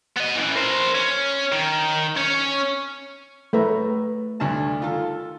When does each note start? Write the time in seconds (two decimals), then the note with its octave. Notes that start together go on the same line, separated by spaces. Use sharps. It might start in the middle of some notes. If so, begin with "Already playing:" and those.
0.17 B3 D#5
0.36 E3 C#4
0.55 A#4 C5
0.95 C#4
1.52 D#3
2.17 C#4 C#5
3.53 A2 A3 B4 E5 A#5
4.40 D2 G2 A5
4.80 D#3 F4 A4